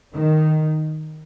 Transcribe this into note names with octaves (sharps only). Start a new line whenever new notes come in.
D#3